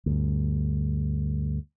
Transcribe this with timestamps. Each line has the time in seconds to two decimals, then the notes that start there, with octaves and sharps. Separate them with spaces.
0.06 D2 G2